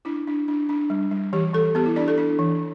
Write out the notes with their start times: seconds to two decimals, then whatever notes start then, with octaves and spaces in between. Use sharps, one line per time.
0.05 D4 E4
0.27 D4
0.48 D4
0.69 D4
0.90 G3
1.11 G3
1.33 E3 G4
1.54 E3 A4
1.75 B3 G4
1.86 E4
1.96 D4 D5
2.08 A4
2.18 D4
2.39 E3